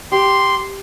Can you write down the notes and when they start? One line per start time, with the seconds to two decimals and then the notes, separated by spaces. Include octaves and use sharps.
0.12 G4 C6